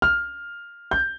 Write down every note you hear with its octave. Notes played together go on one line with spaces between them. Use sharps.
F6
G6